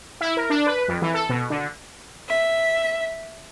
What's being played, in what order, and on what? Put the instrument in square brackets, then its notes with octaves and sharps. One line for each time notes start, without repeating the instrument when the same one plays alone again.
[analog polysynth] E4
A#4
D4
B4
F2
E3
A4
B2
D3
[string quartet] E5